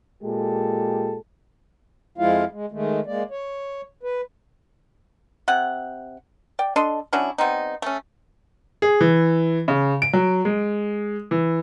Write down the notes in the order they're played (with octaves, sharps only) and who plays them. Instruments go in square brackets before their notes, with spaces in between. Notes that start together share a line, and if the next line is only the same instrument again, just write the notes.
[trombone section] A#2 G#3 G4 A4
[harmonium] F2 F3 G#3 E4 F4 F5
G#3
D#3 G#3 A3
G#3 A#3 D5
C#5
B4
[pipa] C3 F#5
D5 G5
D4 A4 D#5 C6
F#3 C#4 D4 E4
G3 B3 C4 D#4
A3 C#4
[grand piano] G#4
E3
C#3
D7
F#3
G#3
E3